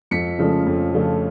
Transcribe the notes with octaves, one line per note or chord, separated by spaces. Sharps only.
F2 B6 C#7
C#3 F3 A3 C#4
F2
C#3 F3 A3 C#4